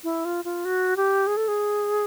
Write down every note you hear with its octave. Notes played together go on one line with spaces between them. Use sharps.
E4
F4
F4
F#4
G4
G#4
A4
G#4